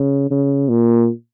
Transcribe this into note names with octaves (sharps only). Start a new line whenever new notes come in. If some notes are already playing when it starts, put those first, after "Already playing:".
Already playing: C#3
C#3
A#2